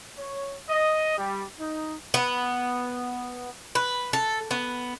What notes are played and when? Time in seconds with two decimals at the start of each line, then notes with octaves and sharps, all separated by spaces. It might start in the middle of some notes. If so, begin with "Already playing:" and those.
0.17 C#5
0.68 D#5
1.17 G3
1.60 D#4
2.14 B3
3.75 B4
4.13 A4
4.51 B3